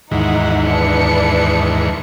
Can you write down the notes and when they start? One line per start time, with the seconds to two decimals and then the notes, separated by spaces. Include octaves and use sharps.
0.11 D#2 G#2 E3 D#4 F#5
0.66 D4 B4 C#7